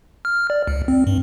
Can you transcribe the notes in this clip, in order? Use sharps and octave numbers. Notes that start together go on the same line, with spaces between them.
F6
D5
C#2
C4
G2